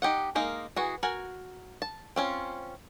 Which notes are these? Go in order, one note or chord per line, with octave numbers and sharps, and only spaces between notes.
D#4 G4 D#5 F#5
G#3 A#3 D#4 A#4
E3 F#4 G#4
F#4 A#4 G#5
A5
C4 C#4 E4 F4